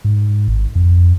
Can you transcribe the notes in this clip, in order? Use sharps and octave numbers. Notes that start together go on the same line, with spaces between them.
G#2
G#1
F2